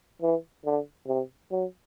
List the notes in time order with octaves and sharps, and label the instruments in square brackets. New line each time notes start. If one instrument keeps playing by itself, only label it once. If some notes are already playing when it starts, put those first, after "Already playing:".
[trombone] E3
D3
C3
F#3